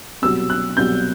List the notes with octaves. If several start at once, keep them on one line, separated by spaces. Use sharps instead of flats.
C2 B2 F#3 E6
F#6
C2 B2 F#3 G6